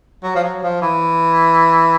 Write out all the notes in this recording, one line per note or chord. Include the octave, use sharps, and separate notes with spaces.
F#3
F3
F#3
F3
E3